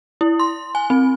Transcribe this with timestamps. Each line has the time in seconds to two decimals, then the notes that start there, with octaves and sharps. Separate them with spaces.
0.21 E4
0.40 C6
0.75 G#5
0.90 C4